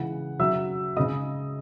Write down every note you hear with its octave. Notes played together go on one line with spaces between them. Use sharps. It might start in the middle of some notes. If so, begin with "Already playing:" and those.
Already playing: C#3 E3 G#3 F#5
C#3 F#3 E5 E6
C#3 G#3 D#5 D#6